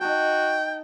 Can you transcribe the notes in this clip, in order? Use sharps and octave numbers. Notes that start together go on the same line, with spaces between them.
D#4 F#4 G5 A5